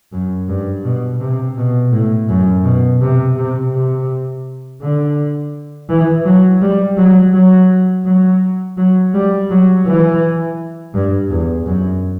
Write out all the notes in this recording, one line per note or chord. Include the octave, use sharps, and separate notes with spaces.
F#2
G2
B2
C3
B2
A2
F#2
B2
C3
C3
C3
D3
E3
F#3
G3
F#3
F#3
F#3
F#3
G3
F#3
E3
G2
E2
F#2